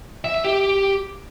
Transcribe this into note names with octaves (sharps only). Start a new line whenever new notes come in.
E5
E5
G4